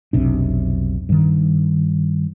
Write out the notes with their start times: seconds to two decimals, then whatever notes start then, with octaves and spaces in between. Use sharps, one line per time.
0.13 F1 B1 C3 D4
1.09 G2 D#3